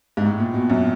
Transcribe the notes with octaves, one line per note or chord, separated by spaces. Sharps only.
G#2
A2
A#2
B2
F#2